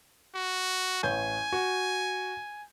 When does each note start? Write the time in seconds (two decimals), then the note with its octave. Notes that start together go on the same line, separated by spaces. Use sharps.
0.35 F#4
1.03 A1 C#5 G#5 G6
1.52 F#4